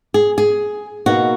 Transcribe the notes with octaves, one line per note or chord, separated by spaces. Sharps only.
G#4
G#4
B2 A#3 D#4 F#4